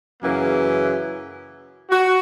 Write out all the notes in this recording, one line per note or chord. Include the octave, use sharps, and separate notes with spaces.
F#2 C#3 E3 A#3
F#4